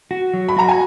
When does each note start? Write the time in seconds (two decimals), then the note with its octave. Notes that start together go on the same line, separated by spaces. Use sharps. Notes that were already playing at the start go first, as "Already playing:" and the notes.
0.11 F#4
0.34 F#3
0.49 B5
0.57 F#4 A#5
0.68 G#5